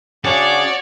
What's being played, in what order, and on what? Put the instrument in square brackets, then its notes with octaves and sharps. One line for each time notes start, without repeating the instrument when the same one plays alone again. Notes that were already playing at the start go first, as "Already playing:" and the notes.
[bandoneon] C#3 D4 G#4 [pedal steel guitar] F#4 [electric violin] C#5 [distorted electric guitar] D5